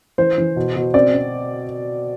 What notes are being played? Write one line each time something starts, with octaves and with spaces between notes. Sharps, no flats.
E3 C5
E3
B2
B2
C4 D5
C4